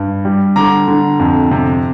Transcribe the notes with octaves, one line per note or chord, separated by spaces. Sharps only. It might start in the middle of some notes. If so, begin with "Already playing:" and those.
Already playing: G2
G3
D3 A#5 D6
D3
F2
C3